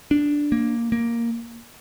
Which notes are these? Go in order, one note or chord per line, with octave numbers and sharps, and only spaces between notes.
D4
A#3
A#3